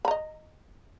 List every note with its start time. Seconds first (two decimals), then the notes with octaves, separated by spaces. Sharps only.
0.05 B5
0.08 A#5
0.11 D#5